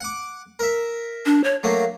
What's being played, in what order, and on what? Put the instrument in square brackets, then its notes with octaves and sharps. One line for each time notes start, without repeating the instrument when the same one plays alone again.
[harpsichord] F#5 D6
A#4 E5
[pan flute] D4
C#5
[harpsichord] F#3 A3 A#3 [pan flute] F5